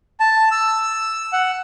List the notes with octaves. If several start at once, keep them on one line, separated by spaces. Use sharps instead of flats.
A5
E6
F#5